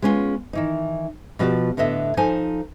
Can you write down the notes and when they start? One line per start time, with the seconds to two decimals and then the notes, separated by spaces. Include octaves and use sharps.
0.02 G#3 B3 C#4 D4 F4
0.53 D#3 E3 D#4
1.39 B2 F3 F#4 G4 C#5 D5
1.77 A2 D3 B3 D#5 E5
2.17 F3 D#4 A4 C5 G#5 A5